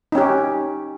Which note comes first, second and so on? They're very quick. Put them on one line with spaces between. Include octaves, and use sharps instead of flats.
D#4 C#4 G4